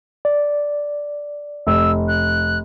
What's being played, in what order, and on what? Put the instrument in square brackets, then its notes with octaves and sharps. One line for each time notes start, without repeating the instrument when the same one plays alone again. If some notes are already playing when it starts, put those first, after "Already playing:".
[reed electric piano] D5
[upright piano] F1 [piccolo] E6
[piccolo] F#6